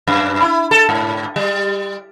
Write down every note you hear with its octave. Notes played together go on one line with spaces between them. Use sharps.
F#2
E4
A4
G#2
G3